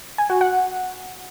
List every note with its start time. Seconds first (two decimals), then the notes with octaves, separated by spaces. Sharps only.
0.18 G#5
0.30 F#4
0.41 F#5